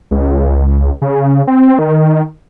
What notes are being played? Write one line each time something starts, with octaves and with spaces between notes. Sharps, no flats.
C#2
C#3
C4
D#3